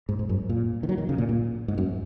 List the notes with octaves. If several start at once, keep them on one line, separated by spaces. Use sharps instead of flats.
G#2
G#2
F#2
A#2
D#3
F#3
D#3
C#3
A#2
A#2
G#2
F#2